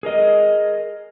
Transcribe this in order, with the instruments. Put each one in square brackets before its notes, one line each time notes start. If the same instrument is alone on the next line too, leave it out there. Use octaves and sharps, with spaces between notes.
[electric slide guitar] G#4 A#4 D#5